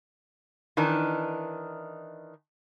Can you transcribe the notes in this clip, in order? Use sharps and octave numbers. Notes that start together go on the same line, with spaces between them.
D#3 E3 D4 D#4